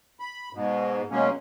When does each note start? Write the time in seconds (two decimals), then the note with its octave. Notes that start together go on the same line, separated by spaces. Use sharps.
0.20 B5
0.53 G#2 B2
1.11 B2 F#3 G#3 A#3 C#4